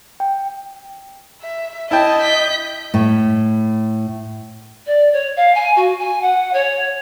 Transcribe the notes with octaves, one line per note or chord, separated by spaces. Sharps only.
G5
E5
E4 D#5 G5 A5
G6 B6
A2
D5
C#5
F5
G#5
F#4
G#5
F#5
C#5